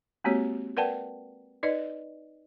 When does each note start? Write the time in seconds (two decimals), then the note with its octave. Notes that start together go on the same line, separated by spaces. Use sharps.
0.24 G#3 A#3 C4 F#4 G4 C#5
0.77 A#4 B4 D5 F#5 G5 A5
1.63 D#4 B4 D5 D#5